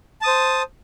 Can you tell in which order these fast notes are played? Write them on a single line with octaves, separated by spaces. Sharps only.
A5 D#6 C5